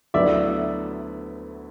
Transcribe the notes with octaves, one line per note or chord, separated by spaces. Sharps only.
D2 D3 F#3 B3 E4 D5 E5